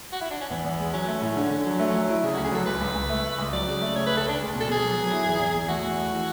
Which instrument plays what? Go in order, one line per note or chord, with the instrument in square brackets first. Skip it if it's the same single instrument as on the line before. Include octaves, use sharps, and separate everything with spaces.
[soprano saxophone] F#4
E4
D4
C#4
[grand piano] E2 [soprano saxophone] B3
[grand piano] E2
G#3
[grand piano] F#3 [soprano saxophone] C#4
[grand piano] A3
[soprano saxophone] C#4
[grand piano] A2
D3
D3
F#3
A3
F#3
E4
[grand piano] C#3 [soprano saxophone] D4
[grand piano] D2 [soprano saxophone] F#4
[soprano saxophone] G#4
[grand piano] F#3 [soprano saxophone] A4
[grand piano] C#2 [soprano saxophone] B4
[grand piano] C#2
C#2
A3
A3
C#2
[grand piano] F#3 [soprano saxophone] D5
[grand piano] C#3
A3
[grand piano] C#3 [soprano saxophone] C#5
[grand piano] D2 [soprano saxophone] B4
[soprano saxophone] A4
[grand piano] D2 [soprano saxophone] D4
[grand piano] G#3
B2
[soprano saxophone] A4
[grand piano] B2 [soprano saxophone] G#4
[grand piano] F#3
F#3
E4
E2
E2
E2
[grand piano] A3 [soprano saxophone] F#4
[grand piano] E2
A3
E3